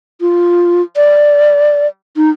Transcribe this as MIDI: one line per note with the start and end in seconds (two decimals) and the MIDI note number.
0.21 0.82 65
0.96 1.87 74
2.16 2.30 63